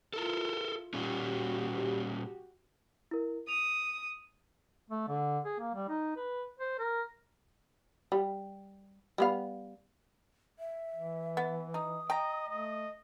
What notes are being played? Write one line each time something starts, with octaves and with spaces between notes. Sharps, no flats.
E4 F4 A4 A#4
A#2 G3 C#4 F#4 G4
E4 A#4
D#6 F7
A3
D3
G#4
A#3
G3
D#4
B4
C5
A#4
G3
G3 B3 F5
E5
E3
B3
D#4 D#6
D#5 G5 A#5
A3 D#5